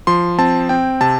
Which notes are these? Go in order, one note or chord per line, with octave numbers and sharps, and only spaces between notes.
F3 C6
C4 A5
C4 G5
C3 A5